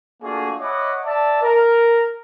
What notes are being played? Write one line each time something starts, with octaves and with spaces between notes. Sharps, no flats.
A3 A#3 D4 F4 F#4 G#4
C#5 D#5 E5 F#5 B5 D6
D5 E5 A5
A#4